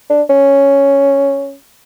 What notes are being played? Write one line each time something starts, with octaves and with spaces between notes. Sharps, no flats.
D4
C#4